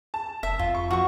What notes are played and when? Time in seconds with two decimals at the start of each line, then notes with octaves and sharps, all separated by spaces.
0.14 A5
0.43 F1 E5
0.59 F2 F4
0.75 C#6
0.91 F3 F#4 C#6